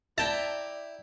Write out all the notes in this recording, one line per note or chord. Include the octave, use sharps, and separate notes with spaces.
E4 D5 E5 G5 A5 A#5